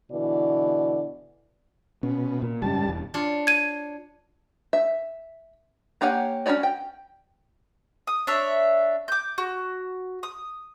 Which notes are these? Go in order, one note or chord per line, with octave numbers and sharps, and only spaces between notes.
B2 D3 E3 D5
B2 C#4
A#2
F#1 G#2 G3 C#4 A5
E1 E2
D4 F4 C#5
G#6 D#7
E5
A#3 G4 C#5 F#5 G#5
C#4 E4 F#4 C#5 D5
G5
D#6
D4 C#5 E5
D6 G6
F#4
D#6